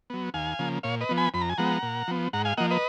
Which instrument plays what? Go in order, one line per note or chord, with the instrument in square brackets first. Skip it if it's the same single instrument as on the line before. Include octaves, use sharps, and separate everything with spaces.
[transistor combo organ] F#3 B3
D#2 F5 G#5
C#3 F3 A#3
A#2 C#5 F5
B4 D#5
F3 B3
G#5 B5
F2 B5
A#5
G#5
F3 G#3 B3 F#5 A#5
A#2
F3 B3
G#2 F#5 A#5
F5 G#5
F3 A#3 D#5 F#5
B4 D#5